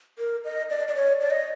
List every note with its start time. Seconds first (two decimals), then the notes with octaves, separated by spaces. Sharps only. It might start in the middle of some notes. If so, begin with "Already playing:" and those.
0.19 A#4
0.45 D#5
0.70 D5
0.88 D5
0.95 C#5
1.21 D5
1.31 D#5